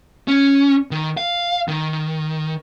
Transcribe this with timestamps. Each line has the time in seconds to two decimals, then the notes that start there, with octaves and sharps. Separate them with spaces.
0.28 C#4
0.91 D#3
1.17 F5
1.68 D#3